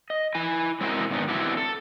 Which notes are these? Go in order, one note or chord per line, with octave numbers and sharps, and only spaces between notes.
D#5
E4 G#5
G#3 C4 E4 F#4 A#4
G#2 D#3 B3 D4
B3 C4 D4 E4 F#4 G4
A4